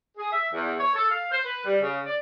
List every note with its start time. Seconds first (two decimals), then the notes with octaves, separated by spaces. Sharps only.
0.17 G#4
0.32 E5
0.53 E2
0.79 C#5
0.94 A4
1.10 F5
1.32 C5
1.45 B4
1.65 G3
1.81 C#3
2.06 D5